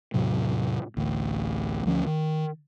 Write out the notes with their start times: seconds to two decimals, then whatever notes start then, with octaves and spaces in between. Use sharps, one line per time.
0.14 E2 A2 C3 F#3
0.97 A1 D2
1.86 D2 F3 A3 C#4
2.06 D#3